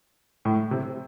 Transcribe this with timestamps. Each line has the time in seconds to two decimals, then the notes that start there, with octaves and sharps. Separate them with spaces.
0.45 A2
0.71 C3